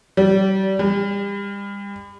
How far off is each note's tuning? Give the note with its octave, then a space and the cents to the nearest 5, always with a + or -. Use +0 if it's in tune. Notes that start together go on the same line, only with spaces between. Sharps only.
G3 -30
G3 +35